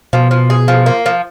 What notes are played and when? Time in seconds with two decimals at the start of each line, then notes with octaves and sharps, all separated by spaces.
0.13 B2 F3
0.31 F3
0.50 G#4
0.68 F3
0.86 A#3
1.06 F3